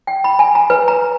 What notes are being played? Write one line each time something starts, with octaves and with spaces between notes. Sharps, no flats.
G5
B5
G#5
A#5
B4
A#5